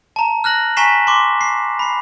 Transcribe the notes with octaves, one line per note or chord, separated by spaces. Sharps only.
A5 A#5
F6 F#6 A#6 F#7
G#5 A#5 C#6 B6 C7 E7
C6 D6
C7
B5 C7